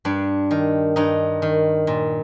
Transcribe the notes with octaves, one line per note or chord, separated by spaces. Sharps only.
G2 D4
D#3
G2 D#4
D#3
A#2